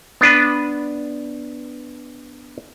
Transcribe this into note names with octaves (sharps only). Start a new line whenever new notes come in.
B3 D4 B4